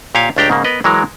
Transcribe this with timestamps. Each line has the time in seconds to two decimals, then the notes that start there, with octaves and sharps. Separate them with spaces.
0.15 A#2 G4 C#5 F5 G#5
0.36 C#2 A3 D4 G4 G5 A#5
0.50 G#2 C#3 A#3
0.64 B3 A#4 B4 D#5
0.84 E3 F#3 G#3 A#4